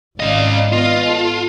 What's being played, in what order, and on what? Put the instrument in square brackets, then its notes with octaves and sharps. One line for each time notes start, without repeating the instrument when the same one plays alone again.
[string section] G#1 D5 F5 [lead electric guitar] C#4 D#5
[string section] B3 D#5 [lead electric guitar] F4
[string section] A4